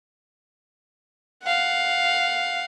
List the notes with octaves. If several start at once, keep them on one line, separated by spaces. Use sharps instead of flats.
F5 F#5